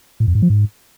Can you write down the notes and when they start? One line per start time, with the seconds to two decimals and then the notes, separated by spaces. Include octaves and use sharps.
0.20 A2
0.28 F2
0.35 G#2
0.42 F3
0.50 G#2